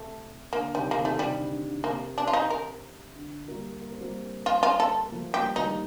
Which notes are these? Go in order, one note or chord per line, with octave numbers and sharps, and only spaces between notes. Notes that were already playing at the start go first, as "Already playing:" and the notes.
Already playing: C3 A3
D3 A#3
C3 D#3 G3
A#3
C3 D#3
A3
C3 D#3 G3
D3
D3
D3
C3 A#3
D4
F4
D#4
A#4
D3
G3 A#3
A#3
C4
G3 A#3
F4
F4
A4
A#3
F3 A3
G3 A#3 G4
D#3 G3 D#4